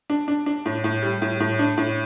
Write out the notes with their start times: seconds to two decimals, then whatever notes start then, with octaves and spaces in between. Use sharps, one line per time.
0.10 D4
0.28 D4
0.46 D4
0.66 A2
0.84 A2
1.03 G3
1.22 A2
1.40 A2
1.59 D4
1.77 A2